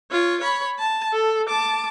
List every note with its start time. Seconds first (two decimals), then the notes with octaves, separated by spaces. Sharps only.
0.12 F4 C#5
0.41 C#5 B5
0.79 A5
1.13 A4
1.48 A5 D6